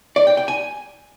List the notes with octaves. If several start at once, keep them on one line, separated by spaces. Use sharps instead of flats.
D5
G5
G5
G#5